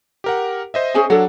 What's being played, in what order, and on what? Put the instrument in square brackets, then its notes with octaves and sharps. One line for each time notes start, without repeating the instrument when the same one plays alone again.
[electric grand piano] G4 A#4 F#5
C5 D#5 E5
[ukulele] C#4 G#4 G#5
[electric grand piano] F#3 D4 [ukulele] A4 F#5